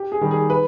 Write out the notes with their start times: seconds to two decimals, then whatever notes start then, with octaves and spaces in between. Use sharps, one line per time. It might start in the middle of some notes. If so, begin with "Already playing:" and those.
Already playing: G4
0.12 G#4
0.21 D#3 G3
0.31 G#4
0.50 B4